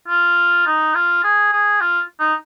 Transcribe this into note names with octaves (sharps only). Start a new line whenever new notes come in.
F4
D#4
F4
G#4
G#4
F4
D#4